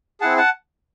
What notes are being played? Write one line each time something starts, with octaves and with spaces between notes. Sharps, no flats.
C4 E4 G#4 F#5 A5
F#5 A5